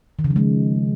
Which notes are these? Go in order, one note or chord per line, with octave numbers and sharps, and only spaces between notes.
D#3
C#3
F3
G#3